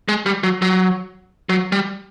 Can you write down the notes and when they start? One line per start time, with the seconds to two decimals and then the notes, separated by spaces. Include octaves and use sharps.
0.08 G#3
0.26 G3
0.43 F#3
0.62 F#3
1.49 F#3
1.72 G3